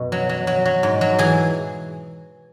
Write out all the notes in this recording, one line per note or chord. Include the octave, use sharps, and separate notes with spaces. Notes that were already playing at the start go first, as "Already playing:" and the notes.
Already playing: F#2 B2
F#3
F#3
F#3
F#3
G#2
F#3
E3 G#4